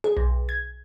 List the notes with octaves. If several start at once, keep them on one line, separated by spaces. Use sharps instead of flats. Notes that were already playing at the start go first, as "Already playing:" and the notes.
G#4
B1
G#6